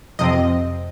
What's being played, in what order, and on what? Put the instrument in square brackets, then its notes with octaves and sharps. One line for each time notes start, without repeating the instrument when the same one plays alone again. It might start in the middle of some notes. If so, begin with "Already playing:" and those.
[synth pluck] F2 C3 F3 C4 D#5